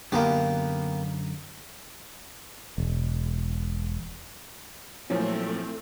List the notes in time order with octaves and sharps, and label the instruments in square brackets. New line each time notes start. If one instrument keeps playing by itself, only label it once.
[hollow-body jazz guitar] F#2 D3 [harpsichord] A#3 B3 G4
[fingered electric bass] E1
[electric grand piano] A#2 F3 F#3 [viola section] A3 C4 [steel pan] C#4 [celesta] E4